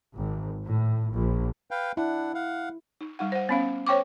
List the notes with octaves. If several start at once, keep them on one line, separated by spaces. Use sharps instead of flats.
G#1
A2
A#1
B4 F5 G5
D4 E4 F#5
F5 F#5
D#4
G3 D#4 F#5
C5 F#5
B3 C#4 F5
C5 C#5 G5 C#6 D6